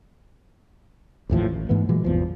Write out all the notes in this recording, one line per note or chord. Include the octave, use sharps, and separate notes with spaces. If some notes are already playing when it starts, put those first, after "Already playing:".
A1 D#2 A2 F3
A1
G#2 E3 A3 B3
A#2 E3 F#3 G#3
G#1 E2 B2 F3